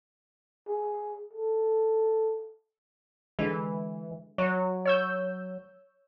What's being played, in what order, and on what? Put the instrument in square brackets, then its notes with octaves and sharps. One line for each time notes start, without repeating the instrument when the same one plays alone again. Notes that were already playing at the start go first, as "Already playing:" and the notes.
[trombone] G#4
A4
[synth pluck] D3 G#3 [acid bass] E3
[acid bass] F#3 [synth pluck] C#5
[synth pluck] C#5 E6 G6